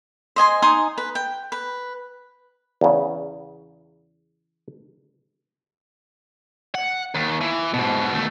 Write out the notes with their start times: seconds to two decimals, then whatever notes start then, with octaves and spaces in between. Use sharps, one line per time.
0.36 C5 D#5 G#5 C6
0.62 D#4 G#5 C6 D#6
0.98 B4
1.15 G5
1.52 B4
2.81 E2 C#3
6.75 F#5
7.15 D#2
7.41 E3
7.74 G#2 B2
8.14 D#2 A3